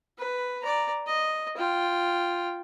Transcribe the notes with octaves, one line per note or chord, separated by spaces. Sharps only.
B4
D5 A#5
D#5
F4 G5